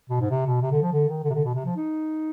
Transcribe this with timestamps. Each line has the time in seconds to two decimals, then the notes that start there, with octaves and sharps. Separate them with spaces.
0.10 B2
0.20 G#2
0.31 C3
0.46 B2
0.62 C3
0.72 D3
0.82 F3
0.93 D3
1.08 D#3
1.24 D3
1.30 C3
1.35 D3
1.45 B2
1.55 C3
1.65 F3
1.76 D#4